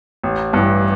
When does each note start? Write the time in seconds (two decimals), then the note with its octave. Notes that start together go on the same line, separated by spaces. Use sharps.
0.23 A1
0.53 G2 E3